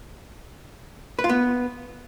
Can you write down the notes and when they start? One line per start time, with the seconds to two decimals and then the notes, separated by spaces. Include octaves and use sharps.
1.19 B4
1.24 F4
1.29 B3